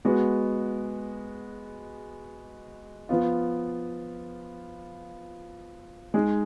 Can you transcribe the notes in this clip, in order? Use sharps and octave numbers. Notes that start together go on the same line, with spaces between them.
G#3 B3 F#4
F3 B3 F4
G#3 D#4 G#4